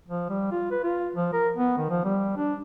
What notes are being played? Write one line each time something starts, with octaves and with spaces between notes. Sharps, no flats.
F3
G3
F4
B4
F4
F3
A#4
B3
D#3
F3
G3
D4